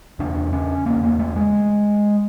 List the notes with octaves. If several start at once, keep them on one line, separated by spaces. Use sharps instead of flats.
E2 C#3 D4
C#4
E2 C#3 A#3
A#3
A3
G#3